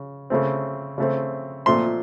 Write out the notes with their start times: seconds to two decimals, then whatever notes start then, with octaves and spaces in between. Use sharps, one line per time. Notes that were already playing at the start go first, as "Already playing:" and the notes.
Already playing: C#3
0.30 C#3 A3 C4
0.98 C#3 A3 C4
1.66 A#2 F3 A3 C4 C6